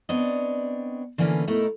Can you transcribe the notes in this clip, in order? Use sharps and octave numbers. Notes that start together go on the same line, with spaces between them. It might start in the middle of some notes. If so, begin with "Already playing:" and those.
B3 C4 D4 C#5 D#5
D3 E3 A3 A#3 C#4 B4
B2 A3 D#4 E4 A#4